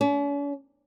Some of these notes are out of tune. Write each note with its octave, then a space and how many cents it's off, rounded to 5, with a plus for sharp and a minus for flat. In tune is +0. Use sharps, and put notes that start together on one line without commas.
C#4 +45